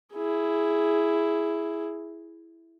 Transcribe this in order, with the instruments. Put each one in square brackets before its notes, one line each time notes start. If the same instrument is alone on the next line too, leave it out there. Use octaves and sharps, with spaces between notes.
[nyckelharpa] E4 G#4